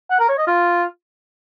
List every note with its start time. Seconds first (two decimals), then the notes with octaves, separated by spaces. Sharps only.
0.10 F#5
0.20 A#4
0.29 C#5
0.38 D#5
0.48 F4